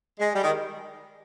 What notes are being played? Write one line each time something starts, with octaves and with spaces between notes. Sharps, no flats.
G#3
G3
D#3